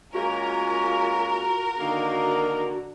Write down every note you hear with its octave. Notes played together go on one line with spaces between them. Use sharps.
G#3 A#3 C#4 F4 F#4 A#4
D3 D#3 A#3